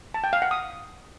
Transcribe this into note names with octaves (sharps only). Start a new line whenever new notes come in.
A5
G5
F5
F#5
D#6